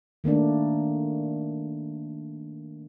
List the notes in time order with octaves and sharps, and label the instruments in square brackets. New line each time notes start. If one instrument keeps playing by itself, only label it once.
[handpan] D#3 A3 A#3 D4